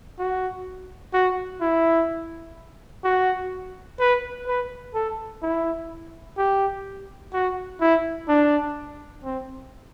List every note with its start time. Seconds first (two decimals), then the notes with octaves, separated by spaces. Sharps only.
0.19 F#4
1.14 F#4
1.61 E4
3.04 F#4
4.00 B4
4.47 B4
4.95 A4
5.42 E4
6.38 G4
7.33 F#4
7.81 E4
8.29 D4
9.24 C4